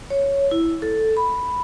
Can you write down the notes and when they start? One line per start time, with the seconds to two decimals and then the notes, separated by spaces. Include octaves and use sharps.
0.10 C#5
0.51 E4
0.82 A4
1.17 B5